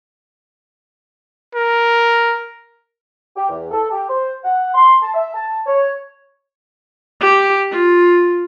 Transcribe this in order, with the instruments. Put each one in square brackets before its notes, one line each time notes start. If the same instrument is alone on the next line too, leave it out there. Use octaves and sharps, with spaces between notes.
[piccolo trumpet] A#4
[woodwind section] G4
E2
A4
G4
C5
F#5
C6
A5
E5
A5
C#5
[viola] G4
F4